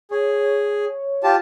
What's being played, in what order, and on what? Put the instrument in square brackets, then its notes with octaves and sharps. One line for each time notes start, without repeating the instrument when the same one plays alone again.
[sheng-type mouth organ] G#4 [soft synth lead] C#5
[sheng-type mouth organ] F4 G4 A5